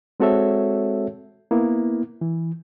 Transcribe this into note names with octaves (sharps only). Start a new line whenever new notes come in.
G#3 C4 F#4 A4 C#5 E5
A#3 B3 E4
E3